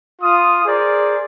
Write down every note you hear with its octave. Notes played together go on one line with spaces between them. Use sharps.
F4 D#6
G#4 A#4 C5 D5